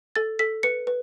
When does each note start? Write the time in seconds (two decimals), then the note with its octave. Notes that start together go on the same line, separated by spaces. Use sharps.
0.16 A4 A6
0.39 A4 B6
0.63 B4 C#7
0.87 B4